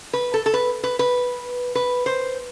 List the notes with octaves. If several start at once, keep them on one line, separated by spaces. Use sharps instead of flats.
B4
A4
A4
B4
B4
B4
B4
C5